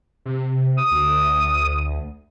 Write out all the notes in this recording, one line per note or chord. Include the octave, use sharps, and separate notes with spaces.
C3
D#6
D2